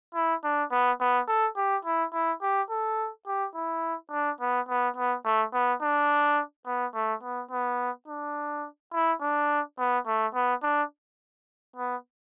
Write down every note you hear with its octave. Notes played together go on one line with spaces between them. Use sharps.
E4
D4
B3
B3
A4
G4
E4
E4
G4
A4
G4
E4
D4
B3
B3
B3
A3
B3
D4
B3
A3
B3
B3
D4
E4
D4
B3
A3
B3
D4
B3